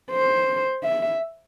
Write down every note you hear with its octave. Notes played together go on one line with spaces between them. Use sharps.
C5
E5